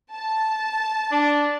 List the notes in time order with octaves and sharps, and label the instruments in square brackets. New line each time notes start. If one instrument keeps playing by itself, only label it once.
[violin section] A5
[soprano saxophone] D4